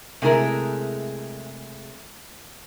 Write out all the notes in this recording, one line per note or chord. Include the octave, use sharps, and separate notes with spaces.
C3 G#3 A3 E4 G#4 A#4